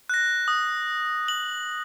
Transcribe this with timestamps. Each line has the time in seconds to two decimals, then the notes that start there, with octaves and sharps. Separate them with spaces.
0.09 F#6 A#6
0.48 D#6
1.28 F#7